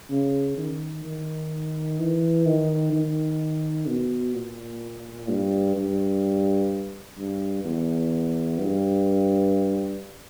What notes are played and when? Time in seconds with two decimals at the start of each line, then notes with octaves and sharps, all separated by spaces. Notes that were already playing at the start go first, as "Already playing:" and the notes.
0.10 C#3
0.58 D#3
1.05 D#3
2.00 E3
2.46 D#3
2.93 D#3
3.88 B2
4.34 A#2
5.29 G2
5.77 G2
7.18 G2
7.64 E2
8.59 G2